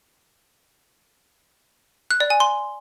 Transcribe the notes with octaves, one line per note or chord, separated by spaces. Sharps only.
F#6
D5
G#5
C6